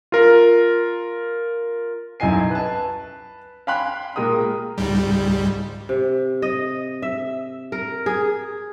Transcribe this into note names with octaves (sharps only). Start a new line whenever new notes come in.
F4 A#4
B1 F#2 E4 D#5 G#5 C7
B4 A5
F5 G5 G#5 B5 C6 F#6
A#2 G#3 A#4 G5 D#6
C#2 G#2 G3
C3
D#5
E5
A#4
G#4